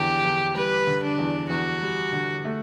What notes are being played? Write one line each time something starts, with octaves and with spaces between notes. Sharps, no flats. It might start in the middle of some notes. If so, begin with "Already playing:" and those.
Already playing: E2 D3 G4
E2
G3 B4
D3
D4
E2
E2 F#4
G3
D3
A3